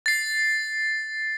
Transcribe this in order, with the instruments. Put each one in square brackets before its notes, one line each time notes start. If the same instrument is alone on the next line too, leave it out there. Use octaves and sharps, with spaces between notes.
[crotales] A6 C7